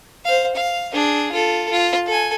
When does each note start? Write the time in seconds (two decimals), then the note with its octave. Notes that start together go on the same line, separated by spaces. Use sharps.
0.25 C5 F5
0.55 F5
0.93 D4 G#4
1.32 F4 A4
1.71 F4
2.06 A4 G#5